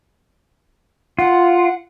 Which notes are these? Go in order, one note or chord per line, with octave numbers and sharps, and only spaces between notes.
F4 F#5